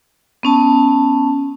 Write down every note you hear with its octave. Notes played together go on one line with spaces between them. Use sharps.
B3 C#4 A5